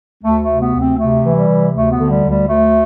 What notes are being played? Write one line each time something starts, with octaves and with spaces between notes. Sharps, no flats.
D2 A3
A3
C3
B3
D2
C4
C3 A3
E3
G3
C3
D2 A3
B3
D3
G3
D2
G3
D2 A3